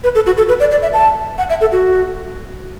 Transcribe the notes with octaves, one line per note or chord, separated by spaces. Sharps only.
B4
A4
F#4
A4
B4
D5
D5
E5
A5
F#5
E5
A4
F#4